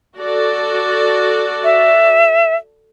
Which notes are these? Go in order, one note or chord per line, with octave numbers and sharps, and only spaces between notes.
F#4 A4 D5
E5